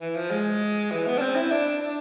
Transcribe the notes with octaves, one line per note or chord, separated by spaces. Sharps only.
E3
F3
G#3
E3
B3
D4
C4
E4
D4
D4